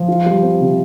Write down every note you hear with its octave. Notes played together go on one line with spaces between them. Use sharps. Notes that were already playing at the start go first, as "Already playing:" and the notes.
Already playing: F3
F4
G3
C4
C3